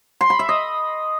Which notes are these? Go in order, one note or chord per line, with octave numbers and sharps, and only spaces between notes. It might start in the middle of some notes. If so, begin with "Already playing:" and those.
C6
B5
E5
D#5